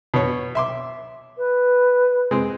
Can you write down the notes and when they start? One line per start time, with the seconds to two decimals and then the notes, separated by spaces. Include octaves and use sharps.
0.14 B2 C#5
0.55 E5 C6 D6
1.38 B4
2.31 G#3 C4